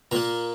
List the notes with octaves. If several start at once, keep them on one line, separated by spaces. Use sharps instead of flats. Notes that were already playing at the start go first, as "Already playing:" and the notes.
A#2 A#3 A#5